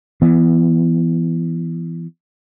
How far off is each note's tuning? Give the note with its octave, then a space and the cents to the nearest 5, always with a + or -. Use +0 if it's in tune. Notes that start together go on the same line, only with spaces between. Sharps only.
E3 +20 B3 +0